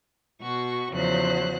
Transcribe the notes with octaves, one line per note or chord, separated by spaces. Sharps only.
B2 F#4 C#6
E2 C#3 F3 F#3 C5 F#6